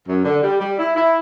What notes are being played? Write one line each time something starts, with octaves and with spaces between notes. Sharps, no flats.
F#2
D3
G3
G3
E4
E4